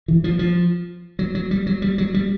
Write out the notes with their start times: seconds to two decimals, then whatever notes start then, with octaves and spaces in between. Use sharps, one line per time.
0.08 E3
0.24 F3
0.39 F3
1.19 F#3
1.35 F#3
1.51 G3
1.67 F#3
1.82 G3
1.98 F#3
2.14 G3